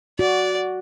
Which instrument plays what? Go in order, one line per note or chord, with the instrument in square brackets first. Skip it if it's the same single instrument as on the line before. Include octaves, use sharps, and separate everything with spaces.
[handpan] F#4 [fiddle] D5